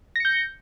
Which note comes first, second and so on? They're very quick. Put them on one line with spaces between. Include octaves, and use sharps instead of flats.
A#6 C#7 G6